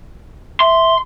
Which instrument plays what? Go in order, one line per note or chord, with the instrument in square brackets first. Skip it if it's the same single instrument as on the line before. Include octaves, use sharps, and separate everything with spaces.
[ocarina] E5 [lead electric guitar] C6